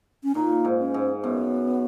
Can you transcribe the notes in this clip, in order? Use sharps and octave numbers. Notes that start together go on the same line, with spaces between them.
C#4
A#2 D#4
G#2
C#4
G#2
F#2 B3